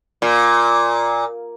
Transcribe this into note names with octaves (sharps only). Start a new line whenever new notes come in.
A#2